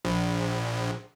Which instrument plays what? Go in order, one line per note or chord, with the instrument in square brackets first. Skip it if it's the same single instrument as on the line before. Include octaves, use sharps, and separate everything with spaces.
[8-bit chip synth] A#1